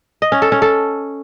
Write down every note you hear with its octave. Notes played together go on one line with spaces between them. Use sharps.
D#5
C#4
A4
C#4
A4